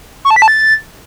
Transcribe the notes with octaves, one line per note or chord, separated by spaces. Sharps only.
C#6
A5
B6
A5
A6